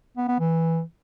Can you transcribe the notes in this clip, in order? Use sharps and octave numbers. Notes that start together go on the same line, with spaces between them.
B3
B3
E3